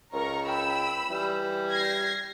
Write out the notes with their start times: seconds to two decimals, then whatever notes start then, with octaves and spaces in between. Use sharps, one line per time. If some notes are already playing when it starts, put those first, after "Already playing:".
0.13 C#2 A#4 A#5 C#6
0.48 G5 B5 E6
1.10 E3 G3
1.69 G#6 A#6 C7